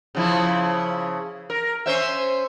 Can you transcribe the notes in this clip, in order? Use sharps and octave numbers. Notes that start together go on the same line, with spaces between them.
C#3 F3 E4
A#4
C#4 C5 E5